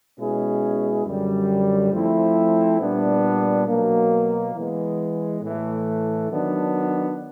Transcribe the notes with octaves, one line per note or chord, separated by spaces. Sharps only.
B2 G#3 C#4 E4 G#4
F#2 D3 G3
F3 A3 C4 E4
A#2 G3 B3 D4
B2 F#3 A#3
E3 G#3 B3
A2 E3 A3
D#3 F#3 B3 D4